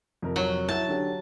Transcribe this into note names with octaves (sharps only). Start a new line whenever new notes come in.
F2 C3 A#4
F#3
E4 F#4 A5
D3 C#4 G4